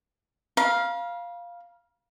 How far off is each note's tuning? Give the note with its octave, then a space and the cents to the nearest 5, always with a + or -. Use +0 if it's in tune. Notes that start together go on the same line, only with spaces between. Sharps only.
F5 +0 B5 -45